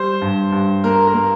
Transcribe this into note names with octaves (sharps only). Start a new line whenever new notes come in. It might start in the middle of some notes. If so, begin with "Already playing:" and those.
Already playing: G3 C5
G2
G2
A#3 A#4
A#4
A#3